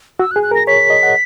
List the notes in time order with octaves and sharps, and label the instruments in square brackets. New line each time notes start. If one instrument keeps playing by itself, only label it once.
[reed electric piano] F#4 [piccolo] E6
[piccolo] F#6
[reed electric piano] G#4
[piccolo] F#6
[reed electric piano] A#4
[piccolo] A#6
[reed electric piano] C#5 [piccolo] B6
[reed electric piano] D#5
F#5